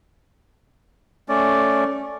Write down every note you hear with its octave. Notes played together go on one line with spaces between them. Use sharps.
A3 C#4 D5